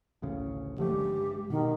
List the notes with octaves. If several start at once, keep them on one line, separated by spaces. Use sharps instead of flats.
A1 D2 C#3
D3 F3 A3 G4
G2 G#3
B2 D#3